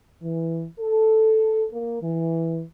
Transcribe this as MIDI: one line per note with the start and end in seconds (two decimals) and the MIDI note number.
0.22 0.65 52
0.80 1.65 69
1.72 2.01 58
2.02 2.62 52